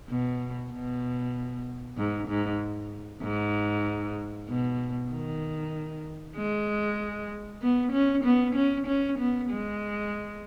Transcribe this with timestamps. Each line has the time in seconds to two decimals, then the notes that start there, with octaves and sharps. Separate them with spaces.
0.10 B2
0.72 B2
1.98 G#2
2.29 G#2
3.22 G#2
4.49 B2
5.11 D#3
6.37 G#3
7.62 B3
7.93 C#4
8.25 B3
8.56 C#4
8.88 C#4
9.19 B3
9.51 G#3